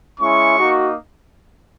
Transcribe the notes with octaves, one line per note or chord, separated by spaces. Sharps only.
G#3 C#4 E4 C#6
A#3 D#4 F#4